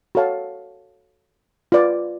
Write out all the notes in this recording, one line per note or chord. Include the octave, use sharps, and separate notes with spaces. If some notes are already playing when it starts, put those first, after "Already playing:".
F#4 A4 C#5 F5 A5
F4 B4 D5